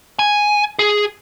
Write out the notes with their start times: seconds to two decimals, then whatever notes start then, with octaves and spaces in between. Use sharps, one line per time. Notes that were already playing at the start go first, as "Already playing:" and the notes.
0.19 G#5
0.79 G#4